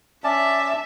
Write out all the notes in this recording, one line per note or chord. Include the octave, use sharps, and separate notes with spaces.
C#4 D5 E5 A5